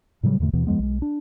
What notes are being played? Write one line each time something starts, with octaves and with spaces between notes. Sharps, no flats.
A2 C#3 F#3 G3
E2 G#2 D3 A3
D#2 B2 E3 B3
F2 F3 G#3 B3
B1 G#3
D4